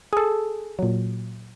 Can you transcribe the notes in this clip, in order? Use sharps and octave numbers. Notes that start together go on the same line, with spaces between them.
G#4 A4
A#2 F#3